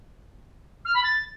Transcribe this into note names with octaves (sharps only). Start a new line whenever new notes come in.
F6
B5
A6